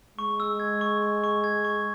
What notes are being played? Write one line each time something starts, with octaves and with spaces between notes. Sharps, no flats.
G#3 C#6
E6
G#6
C#6
C#6
C#6
G#6
C#6